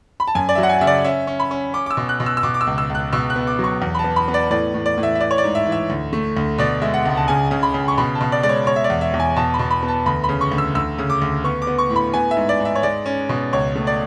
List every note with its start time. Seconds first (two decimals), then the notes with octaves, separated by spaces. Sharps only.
0.20 B5
0.27 A5
0.35 F#2 G#5
0.49 D5
0.55 E5
0.58 F#3
0.63 F#5
0.69 G#5
0.81 C#3 E5
0.87 D5
1.04 C#4 E5
1.27 C#4
1.40 B5
1.51 C#4
1.74 C#4 D6
1.86 D6
1.91 E6
1.97 B2
2.09 F#6
2.20 B2
2.26 E6
2.37 E6
2.43 B2 D6
2.54 D6
2.61 E6
2.67 C#2
2.78 E6
2.90 C#2
2.95 F#6
3.13 B2 E6
3.30 F#6
3.36 B3
3.47 D6
3.59 F#3
3.64 C#6
3.82 E2
3.95 B5
3.99 A5
4.04 B3
4.16 B5
4.28 B3
4.34 D5
4.50 A2 D5
4.74 A2
4.86 D5
4.97 A2
5.03 E5
5.15 E5
5.20 E3 D5
5.31 C#5
5.38 D5
5.44 G#2
5.55 E5
5.66 E3
5.72 E5
5.90 D2
6.13 A3
6.37 D2
6.58 B2 D5
6.82 G#3 E5
6.94 F#5
7.05 C#2
7.17 A5
7.28 C#3 G#5
7.51 C#3
7.63 B5
7.74 C#3
7.88 C#6
7.98 B2 B5
8.15 A5
8.21 B2
8.32 D5
8.43 G#3 D5
8.49 C#5
8.67 B2 C#5
8.76 E5
8.84 D5
8.90 E2
9.01 E5
9.14 E2
9.20 G#5
9.36 B2 A5
9.54 B5
9.59 B2
9.71 B5
9.83 B3
9.88 A5
10.06 D2 B5
10.24 B5
10.29 C#3
10.41 C#6
10.52 D2
10.58 E6
10.75 D2 E6
10.98 C#3
11.10 D6
11.22 D2
11.44 B3 C#6
11.62 D6
11.67 B3
11.78 C#6
11.90 A2
11.96 B5
12.14 B3 G#5
12.31 E5
12.37 G#2
12.49 D5
12.60 G#2
12.65 E5
12.76 C#5
12.83 G#3 D5
13.06 C#4
13.29 B2
13.53 C#2 C#5
13.75 A3
13.87 D5